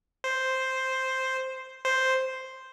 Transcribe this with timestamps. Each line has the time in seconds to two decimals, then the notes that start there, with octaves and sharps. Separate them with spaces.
0.24 C5
1.85 C5